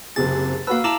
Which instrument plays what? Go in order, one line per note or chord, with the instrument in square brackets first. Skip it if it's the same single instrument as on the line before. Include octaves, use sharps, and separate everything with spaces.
[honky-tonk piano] F#1 C3 G#4 [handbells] A6
[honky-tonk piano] A#3 F#4 B4 [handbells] F5 E6
[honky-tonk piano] E4 E7 F#7 [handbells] A5 A#5 D6